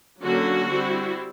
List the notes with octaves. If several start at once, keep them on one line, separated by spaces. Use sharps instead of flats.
D3 F#3 A#3 C#4 F#4
G3 C4 E4